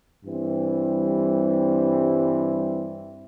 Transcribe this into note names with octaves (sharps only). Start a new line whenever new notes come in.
G2 E3 G3 C4